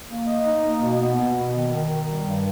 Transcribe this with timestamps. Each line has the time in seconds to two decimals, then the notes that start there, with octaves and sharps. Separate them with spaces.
0.08 A#3
0.27 D#5
0.45 D#4
0.63 A#3
0.80 B2
0.99 B3
1.17 B2
1.35 B2
1.54 D#3
1.72 D#3
1.90 D#3
2.08 G3
2.26 G2